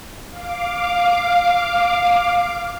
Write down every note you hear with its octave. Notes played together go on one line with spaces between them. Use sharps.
F5 D6